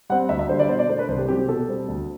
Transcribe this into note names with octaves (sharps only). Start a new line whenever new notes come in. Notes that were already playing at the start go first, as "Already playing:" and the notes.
G3 C4 F#5
D2 E5
E5
D3 G3 C5
D5
B2 C5
D5
A3 D4 C5
B4
C2 C5
G4
C3 F#3 C4 G4
G4
B2 A4
G3 C4
D2